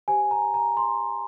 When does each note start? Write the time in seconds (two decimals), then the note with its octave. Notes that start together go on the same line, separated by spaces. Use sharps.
0.08 G4 C5 G#5
0.31 A#5
0.54 A#5
0.77 C6